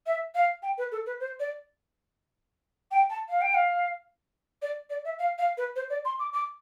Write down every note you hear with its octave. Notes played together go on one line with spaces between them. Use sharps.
E5
F5
G5
B4
A4
B4
C5
D5
G5
A5
F5
G5
F5
D5
D5
E5
F5
F5
B4
C5
D5
C6
D6
D6